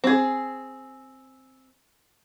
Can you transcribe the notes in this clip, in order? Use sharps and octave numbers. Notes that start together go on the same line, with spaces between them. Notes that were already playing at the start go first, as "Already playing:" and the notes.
C4 G#4